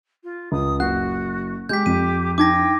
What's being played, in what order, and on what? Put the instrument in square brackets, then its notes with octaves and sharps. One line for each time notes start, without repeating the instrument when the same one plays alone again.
[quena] F4
[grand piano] C#2 [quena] D#6
[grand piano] F#1 [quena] F#4 [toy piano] F#5 [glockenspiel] F#6
[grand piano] G#3 [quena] G4 [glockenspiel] G6 B6
[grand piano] F2 [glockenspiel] D#7
[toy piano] D4 D#4 [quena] G5 [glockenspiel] D6 G#6 A#6